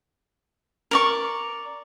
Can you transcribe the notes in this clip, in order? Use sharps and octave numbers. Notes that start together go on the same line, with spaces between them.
A#4 D5 C#6